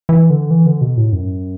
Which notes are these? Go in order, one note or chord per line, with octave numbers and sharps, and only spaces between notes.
E3
D3
E3
D3
B2
A2
F#2